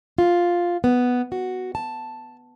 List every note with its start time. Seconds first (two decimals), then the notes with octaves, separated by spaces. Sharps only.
0.18 F4
0.84 B3
1.32 F#4
1.75 A5